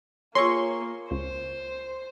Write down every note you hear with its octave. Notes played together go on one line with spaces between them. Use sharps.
A#3 F4 G#4 C#5 C6 C#6 E6 A#6
C#2 C5